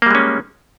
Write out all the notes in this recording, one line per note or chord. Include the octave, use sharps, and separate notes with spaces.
G3 G#3 A#3 C#4